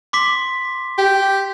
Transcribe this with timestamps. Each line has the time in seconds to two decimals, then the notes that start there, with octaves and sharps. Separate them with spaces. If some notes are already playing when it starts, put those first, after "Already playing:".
0.13 C6 D6 B6
0.98 G4